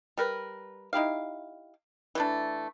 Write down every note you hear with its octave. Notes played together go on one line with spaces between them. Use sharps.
G3 A#4 B4
D#4 E4 G4 F5
E3 A3 D4